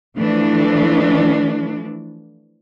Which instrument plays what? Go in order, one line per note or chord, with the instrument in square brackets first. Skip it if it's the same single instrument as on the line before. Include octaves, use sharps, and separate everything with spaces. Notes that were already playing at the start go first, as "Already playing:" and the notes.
[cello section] E3 F3 A3 D4